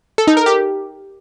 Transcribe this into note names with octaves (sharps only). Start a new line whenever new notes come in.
A4
D#4
A#4
G4